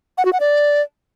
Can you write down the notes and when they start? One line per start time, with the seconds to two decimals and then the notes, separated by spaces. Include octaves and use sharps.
0.18 F#5
0.25 F#4
0.33 F#5
0.40 D5